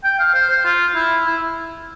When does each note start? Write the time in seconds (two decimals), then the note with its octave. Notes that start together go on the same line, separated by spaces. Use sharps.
0.04 G5
0.19 F5
0.34 C5
0.50 C5
0.65 F4
0.95 E4
1.26 E4